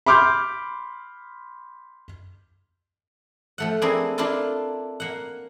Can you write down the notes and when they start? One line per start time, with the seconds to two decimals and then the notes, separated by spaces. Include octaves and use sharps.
0.06 B5 C6 D6 F6 G6
3.58 F3 A3 F#5
3.82 A#3 C4 D4 E4 G#4
4.18 A#3 D4 E4 F4 A4
5.00 A#3 F#5